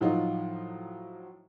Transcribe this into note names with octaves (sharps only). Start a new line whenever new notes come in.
A2 F3 F#3 D#4 F4